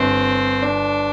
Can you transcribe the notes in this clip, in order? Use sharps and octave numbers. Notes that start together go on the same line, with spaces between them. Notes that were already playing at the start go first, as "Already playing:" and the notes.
Already playing: G1 C4
D4